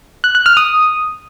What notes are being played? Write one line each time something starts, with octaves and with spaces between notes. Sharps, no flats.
F#6
F#6
F6
D#6